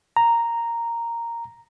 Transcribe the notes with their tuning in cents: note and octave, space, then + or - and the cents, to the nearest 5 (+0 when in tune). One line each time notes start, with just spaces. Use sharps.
A#5 -5